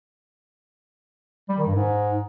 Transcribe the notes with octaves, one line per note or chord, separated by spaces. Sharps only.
G3
D#3
G2
G#2